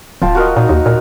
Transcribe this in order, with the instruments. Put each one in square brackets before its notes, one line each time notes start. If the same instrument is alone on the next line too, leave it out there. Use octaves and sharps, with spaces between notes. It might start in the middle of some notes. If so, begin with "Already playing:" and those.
[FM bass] D1 [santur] F4 G5 A5
[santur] F#4 A#4 D#5
[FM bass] A#2 [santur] D#4
[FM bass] D#2
[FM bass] A#2 [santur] A#4